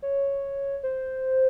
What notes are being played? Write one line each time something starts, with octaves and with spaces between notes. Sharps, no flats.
C#5
C5